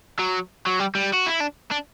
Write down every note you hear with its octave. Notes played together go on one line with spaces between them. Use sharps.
F#3
F#3
G3
G3
F#4
E4
D4
D4